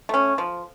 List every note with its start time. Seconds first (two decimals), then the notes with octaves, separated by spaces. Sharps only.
0.09 A3 C#4
0.38 F3